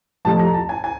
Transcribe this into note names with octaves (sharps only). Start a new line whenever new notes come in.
F2 C3 F3 A3 A5
A#5
A5
G#5
G#5